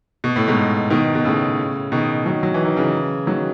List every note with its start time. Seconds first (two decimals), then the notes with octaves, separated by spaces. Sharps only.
0.24 B2
0.36 A2
0.48 G#2 B2
0.90 B2 D#3
1.15 B2
1.25 A2 C#3
1.92 B2 D#3
2.26 D#3 F#3
2.43 F#3
2.54 E3
2.65 D#3
2.77 C#3 E3
3.27 D#3 F#3